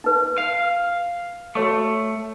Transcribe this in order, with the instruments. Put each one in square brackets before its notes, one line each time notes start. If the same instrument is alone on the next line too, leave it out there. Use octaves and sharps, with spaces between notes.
[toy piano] D#4 B4
[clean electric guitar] F5
[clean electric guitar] A3 [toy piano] F#4 C#5 C#6